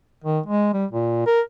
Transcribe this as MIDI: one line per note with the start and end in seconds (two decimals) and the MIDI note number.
0.24 0.40 51
0.46 0.73 56
0.73 0.86 55
0.91 1.23 46
1.27 1.41 70